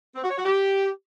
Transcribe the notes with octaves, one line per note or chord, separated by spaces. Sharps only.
C4
F#4
C#5
F#4
G4